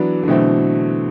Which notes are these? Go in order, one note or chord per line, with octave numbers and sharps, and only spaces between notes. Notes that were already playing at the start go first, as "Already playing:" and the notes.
Already playing: E3 F#3 B3 D4
D3
B2 E3 F#3 A3 C4